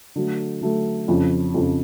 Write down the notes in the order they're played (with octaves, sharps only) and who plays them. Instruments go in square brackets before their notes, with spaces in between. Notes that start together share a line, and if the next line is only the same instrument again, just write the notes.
[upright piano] D3 F#3 A3
D3 F#3 A3
F2 C#3 F3
F2 C#3 F3